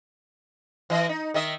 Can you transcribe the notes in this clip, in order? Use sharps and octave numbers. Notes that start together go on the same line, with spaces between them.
E3 D#5
D#4
D#3 D#5 E5